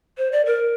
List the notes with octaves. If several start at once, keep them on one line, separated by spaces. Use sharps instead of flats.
C5
D5
A#4